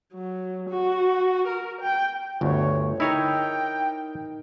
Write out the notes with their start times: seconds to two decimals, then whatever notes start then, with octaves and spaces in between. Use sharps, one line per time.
0.14 F#3
0.70 F#4
1.48 A#4
1.81 G5
2.41 G1 D2 C#5
3.00 D#4 E4 A#4 C#5 G5